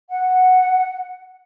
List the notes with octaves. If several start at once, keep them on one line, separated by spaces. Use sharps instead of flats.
F#5